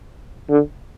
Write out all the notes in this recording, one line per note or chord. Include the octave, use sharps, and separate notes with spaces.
D3